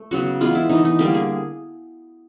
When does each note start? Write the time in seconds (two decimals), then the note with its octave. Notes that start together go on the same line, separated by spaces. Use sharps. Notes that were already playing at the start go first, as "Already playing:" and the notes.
Already playing: A3
0.11 C#3 F#3 B3 F#4
0.40 E3 G#3 B3 F4
0.55 E4
0.69 E3 A3 D#4
0.85 D#4
0.99 D3 G3 A#3 G4
1.14 G#4